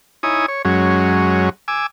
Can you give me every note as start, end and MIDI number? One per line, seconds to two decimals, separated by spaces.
0.23 0.46 63
0.23 0.46 64
0.23 0.46 73
0.23 0.46 80
0.23 0.46 87
0.48 0.62 73
0.65 1.49 42
0.65 1.49 54
0.65 1.49 56
0.65 1.49 61
1.68 1.86 80
1.68 1.86 86
1.68 1.86 88